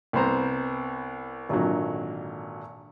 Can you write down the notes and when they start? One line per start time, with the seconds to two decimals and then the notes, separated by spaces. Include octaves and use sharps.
0.13 C2 B3 C5 A#5
1.49 G#1 A#2 D3 F#3